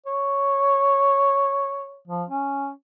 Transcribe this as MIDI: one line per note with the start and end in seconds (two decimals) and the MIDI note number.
0.06 1.99 73
2.08 2.23 53
2.29 2.71 61